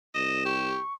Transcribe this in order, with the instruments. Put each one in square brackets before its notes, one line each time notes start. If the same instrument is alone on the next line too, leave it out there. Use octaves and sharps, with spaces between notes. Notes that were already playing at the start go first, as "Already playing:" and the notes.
[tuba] C2 [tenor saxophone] D#5 [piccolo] E7
[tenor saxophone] G4 [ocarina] C#6